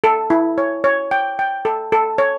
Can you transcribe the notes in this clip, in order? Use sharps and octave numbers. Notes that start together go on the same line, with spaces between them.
A4
E4
C#5
C#5
G5
G5
A4
A4
C#5